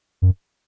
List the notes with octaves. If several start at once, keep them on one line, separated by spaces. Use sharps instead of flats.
F#2